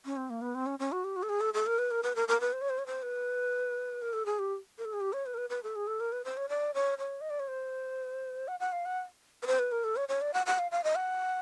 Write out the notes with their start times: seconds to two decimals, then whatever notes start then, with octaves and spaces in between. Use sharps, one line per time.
0.05 C#4
0.17 C4
0.30 A#3
0.41 B3
0.55 C4
0.66 C#4
0.79 C#4
0.92 F#4
1.04 G4
1.16 F#4
1.23 A4
1.29 G#4
1.41 A4
1.54 A4
1.66 A#4
1.78 B4
1.91 A#4
2.03 B4
2.15 A#4
2.28 A#4
2.40 B4
2.53 C5
2.61 C#5
2.69 C5
2.78 C#5
2.86 C5
3.02 B4
4.02 A#4
4.13 A4
4.26 G#4
4.39 G4
4.78 A#4
4.85 A4
4.93 G#4
5.01 G4
5.13 C#5
5.26 B4
5.34 A#4
5.37 B4
5.50 B4
5.63 A4
5.76 G#4
5.87 A4
6.00 A#4
6.12 B4
6.24 C5
6.37 C#5
6.49 D5
6.74 C#5
6.98 C#5
7.21 D#5
7.30 D5
7.39 C#5
7.48 C5
8.48 F#5
8.60 F#5
8.72 F5
8.85 F#5
9.42 B4
9.47 C5
9.59 B4
9.72 A#4
9.84 A4
9.96 C#5
10.09 C#5
10.21 D5
10.34 F#5
10.46 F#5
10.59 F5
10.71 F5
10.84 D#5
10.95 F#5